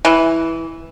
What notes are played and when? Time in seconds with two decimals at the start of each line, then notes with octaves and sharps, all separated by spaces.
0.05 E3